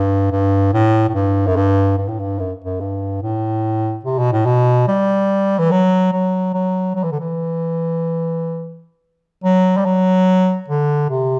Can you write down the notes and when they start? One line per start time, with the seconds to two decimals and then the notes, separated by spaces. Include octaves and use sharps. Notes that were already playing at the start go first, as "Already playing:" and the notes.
Already playing: G2
0.32 G2
0.73 A2
1.09 A2
1.14 G2
1.47 F#2
1.56 G2
1.98 G2
2.08 A2
2.19 G2
2.39 F#2
2.64 F#2
2.80 G2
3.22 A2
4.05 C3
4.19 B2
4.32 A2
4.46 B2
4.88 G3
5.59 E3
5.71 F#3
6.12 F#3
6.54 F#3
6.95 F#3
7.04 E3
7.12 D3
7.20 E3
9.44 F#3
9.77 G3
9.85 F#3
10.68 D3
11.10 C3